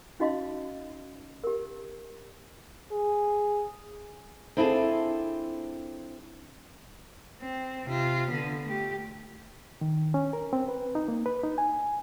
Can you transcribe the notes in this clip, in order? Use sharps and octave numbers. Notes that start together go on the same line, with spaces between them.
C#4 D#4 F#4 D#5 F5 C6
G4 A#4
G#4
C4 D4 E4 F4 G#4 A4
C4
C3 F4
D3 B3
A3 G4
D#3
C#4
A#4
C4
B4
D#4
A#3
B4
D#4
G#5